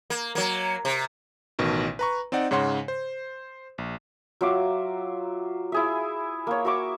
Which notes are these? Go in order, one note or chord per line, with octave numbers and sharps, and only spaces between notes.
A#3
F#3 A#3
C3
A1 B2 D#3
B4 A#5 C#6
C4 D#4 D5 F#5
G#2 C#3 C#5 F#5 C6
C5
A#1
F#3 F4 E5 D6
E4 G#4 E5
A#3 C#5
F#4 E5 C#6 D6